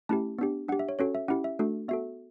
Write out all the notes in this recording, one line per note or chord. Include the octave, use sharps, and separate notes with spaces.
A3 C#4 E4 G4 A5
B3 D4 G4
D4 G4 F#5
E5
C#5
C#4 F#4 A4 C#5
E5
C#4 E4 G4 F#5
E5
A3 D4 F#4 A4
B3 F#4 A4 E5